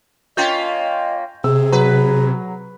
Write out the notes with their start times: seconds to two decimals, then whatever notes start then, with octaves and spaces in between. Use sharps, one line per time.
0.37 A#3 C#4 F4 D#5 G5 G6
1.44 C3 G#4 E6
1.72 F#3 B4 A#5